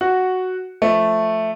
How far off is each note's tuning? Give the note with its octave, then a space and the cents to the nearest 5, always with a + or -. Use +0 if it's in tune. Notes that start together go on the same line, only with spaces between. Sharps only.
F#4 +0 F#5 +0
F3 +0 A3 +0